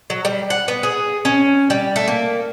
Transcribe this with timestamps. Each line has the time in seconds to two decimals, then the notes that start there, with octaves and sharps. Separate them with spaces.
0.10 F#3
0.25 G3
0.50 F#5
0.68 B3
0.83 G#4
1.25 C#4
1.70 G3
1.96 A3
2.08 A#3